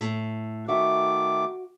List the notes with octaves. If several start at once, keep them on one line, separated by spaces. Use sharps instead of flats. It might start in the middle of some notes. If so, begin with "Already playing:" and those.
A2
D#3 A3 F#4 E5 F#5 D6